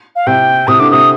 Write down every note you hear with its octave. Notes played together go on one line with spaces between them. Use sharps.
F5
C3 G5
C3 D#6
D3 D6
C3 D#6